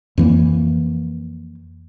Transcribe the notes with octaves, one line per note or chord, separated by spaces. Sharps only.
F2 E3 A#3